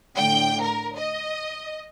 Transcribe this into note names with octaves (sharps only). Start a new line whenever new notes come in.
A2 D3 G5
A#4
D#5